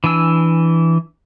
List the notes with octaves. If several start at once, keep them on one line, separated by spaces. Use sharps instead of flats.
E3 D4 G#5 E6